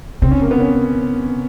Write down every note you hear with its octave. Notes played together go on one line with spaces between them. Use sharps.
C#3 C4
C#4
A#3
B3
C#4